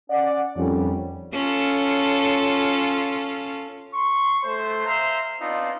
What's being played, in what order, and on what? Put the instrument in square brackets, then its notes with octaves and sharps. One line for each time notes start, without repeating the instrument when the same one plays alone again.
[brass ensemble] C#4 D5 F#5
[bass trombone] F2 [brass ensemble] D#3 G3 C#4
[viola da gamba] C#4 F4 A4
[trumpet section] C6 C#6
A3 C5
C5 E5 F5 A#5 C6
B3 C4 D4 D#4 F4